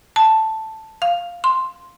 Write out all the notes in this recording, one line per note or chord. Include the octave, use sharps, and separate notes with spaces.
A5
F5
C6